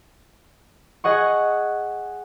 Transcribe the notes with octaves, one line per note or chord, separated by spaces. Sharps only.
G#4 D#5 F#5 C#6